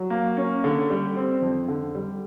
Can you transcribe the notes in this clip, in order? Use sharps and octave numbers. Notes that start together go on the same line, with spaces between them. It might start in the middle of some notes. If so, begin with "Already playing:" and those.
Already playing: F#3
A#3
C#4
D3
G3
C4
F2
D3
G3